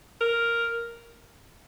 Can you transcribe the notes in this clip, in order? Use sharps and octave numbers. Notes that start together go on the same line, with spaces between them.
A#4